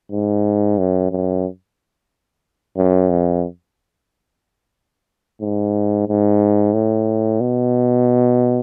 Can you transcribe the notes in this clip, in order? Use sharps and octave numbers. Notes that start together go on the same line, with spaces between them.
G#2
F#2
F#2
F#2
F2
G#2
G#2
A2
B2